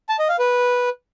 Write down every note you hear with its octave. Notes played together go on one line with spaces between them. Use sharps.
A5
D#5
F5
B4